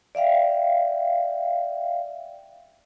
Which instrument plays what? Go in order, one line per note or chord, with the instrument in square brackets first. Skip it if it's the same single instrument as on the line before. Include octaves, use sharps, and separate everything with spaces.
[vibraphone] D5 E5 F5 G5